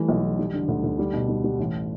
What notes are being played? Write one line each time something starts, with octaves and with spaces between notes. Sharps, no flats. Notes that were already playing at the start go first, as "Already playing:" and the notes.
Already playing: E3 G3 A3
B1
E3
G3
D3
D2
D2
G3
B2
G3
G3
A1